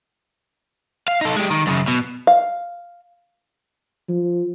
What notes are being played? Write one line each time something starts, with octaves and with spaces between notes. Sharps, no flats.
F5
D#4 A4
G#3 G4
D#3
F#2 C#3
B2
F5
F3